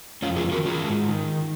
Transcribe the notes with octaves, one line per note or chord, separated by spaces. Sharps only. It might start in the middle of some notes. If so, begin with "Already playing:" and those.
F2 C#4 F4
F4 G#4
D#3 F#4 A#4
F4 G#4
G#2
D#3